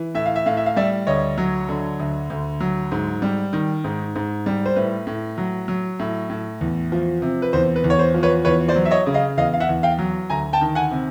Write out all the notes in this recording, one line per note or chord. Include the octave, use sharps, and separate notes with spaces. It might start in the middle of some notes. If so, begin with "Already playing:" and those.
Already playing: E3
A2 E5
F5
E5
A2 F5
E5
F5
G3 D5 E5
D2 C#5 D#5
F#3
D3
D2
D2
F#3
G#2
G3
D#3
G#2
G#2
G3
C5
A2 B4
A2
F#3
F#3
A2
A2
E2
F3
C3
B4
E2 C5
B4
E2
C#5
C5
F3
B4 C#5
E2 B4 C#5
C5 D5
F#3
E5
C#5 D#5
C#3
D#5 F5
E2 D#5 F5
F5
E5 F#5
E2
F5 G5
F#3
D2 G#5 A#5
G5 A5
D#3
F#5 G#5
C3